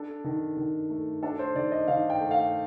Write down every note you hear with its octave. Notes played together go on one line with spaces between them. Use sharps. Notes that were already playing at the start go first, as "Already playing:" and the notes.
Already playing: D4 A4
D#3
D#3
A3
D4 A4
C5
D#3 D5
D#5
D#3 F5
G5
A3
F5